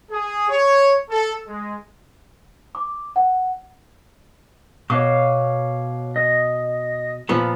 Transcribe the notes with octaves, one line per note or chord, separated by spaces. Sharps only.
G#4
C#5
A4
G#3
D6
F#5
B2 C#5 F5 D6
D#5
A#2 F3 B3 B5